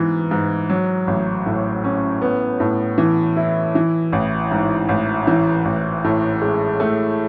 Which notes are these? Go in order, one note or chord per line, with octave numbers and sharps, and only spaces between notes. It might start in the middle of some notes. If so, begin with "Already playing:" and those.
Already playing: G#2 E3 B3
G#2
F#3
A1
A2
C#4
B3
A2
E3
E4
E3
A1
G#2
A1
E3
A1
A2
G#3
A3